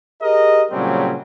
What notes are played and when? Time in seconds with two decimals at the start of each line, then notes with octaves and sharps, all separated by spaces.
0.22 G4 G#4 A#4 D#5
0.72 A#2 C#3 F#3 G3 C4 C#4